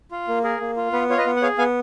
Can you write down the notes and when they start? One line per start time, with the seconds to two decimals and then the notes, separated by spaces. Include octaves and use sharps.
0.11 F4
0.28 A#3
0.44 G#4 A#4
0.60 A#3
0.77 F4
0.93 B3 B4
1.10 F4 C#5
1.18 B4 D#5
1.26 B3
1.36 F#5
1.42 G#4 C#5 F5
1.58 B3 F5 G#5